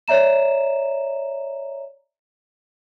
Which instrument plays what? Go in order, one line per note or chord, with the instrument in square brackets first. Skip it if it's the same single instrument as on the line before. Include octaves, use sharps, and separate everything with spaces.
[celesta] C#5 D5 E5 A#5 E7